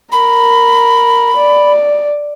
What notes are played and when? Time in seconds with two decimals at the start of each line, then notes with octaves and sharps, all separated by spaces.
0.12 A#4 B5
1.37 D5